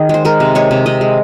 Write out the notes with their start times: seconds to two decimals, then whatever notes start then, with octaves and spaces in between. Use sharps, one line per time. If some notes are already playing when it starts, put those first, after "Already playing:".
Already playing: D#3 G#4
0.09 G#3 C5
0.25 G#3 A#4
0.40 C3
0.55 G#3 C#5
0.71 C3
0.86 C3 D#5
1.01 G#3